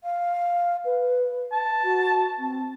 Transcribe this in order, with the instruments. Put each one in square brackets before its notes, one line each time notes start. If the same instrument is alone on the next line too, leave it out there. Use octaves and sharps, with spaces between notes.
[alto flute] F5
B4
[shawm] A5
[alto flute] F#4
C4